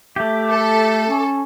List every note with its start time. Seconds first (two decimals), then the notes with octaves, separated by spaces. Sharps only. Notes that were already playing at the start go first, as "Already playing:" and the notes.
0.16 A3 G4 E5 D6
0.51 A4
1.07 C#4